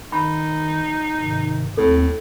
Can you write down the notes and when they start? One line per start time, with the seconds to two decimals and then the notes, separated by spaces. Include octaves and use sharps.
0.12 D#3 D#4 B5
1.20 G#2 C3 D#3
1.77 D#2 A2 C4 A4